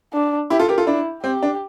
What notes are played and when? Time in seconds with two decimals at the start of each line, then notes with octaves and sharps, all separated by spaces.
0.13 D4
0.50 E4 G4
0.59 F4 A4
0.68 G4 A#4
0.78 F4 A4
0.87 D4 E4
1.23 C4 G4
1.43 D4